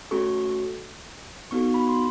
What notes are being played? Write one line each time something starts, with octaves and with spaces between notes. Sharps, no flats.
A3 C#4 F#4 A4 C#6
B3 D#4 F#4 A4 C#6
B5
C6